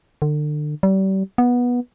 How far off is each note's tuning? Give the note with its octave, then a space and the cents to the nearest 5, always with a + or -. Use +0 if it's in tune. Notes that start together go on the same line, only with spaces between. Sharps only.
D3 +35
G3 -35
B3 -15